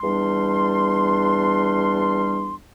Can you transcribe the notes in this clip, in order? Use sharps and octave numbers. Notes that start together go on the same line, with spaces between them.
E2 G3 D4 C6